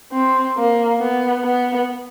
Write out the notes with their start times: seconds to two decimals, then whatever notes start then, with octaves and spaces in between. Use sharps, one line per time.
0.12 C4
0.57 A#3
1.00 B3
1.45 B3